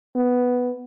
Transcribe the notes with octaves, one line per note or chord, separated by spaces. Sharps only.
B3